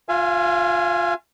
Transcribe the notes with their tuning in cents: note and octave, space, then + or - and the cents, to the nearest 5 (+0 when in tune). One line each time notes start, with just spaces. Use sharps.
F4 +20 F5 -40 G#5 +0